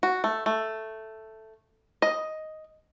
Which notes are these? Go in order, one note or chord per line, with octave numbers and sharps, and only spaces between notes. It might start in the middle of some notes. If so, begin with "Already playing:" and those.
F#4
A3
A3
D#5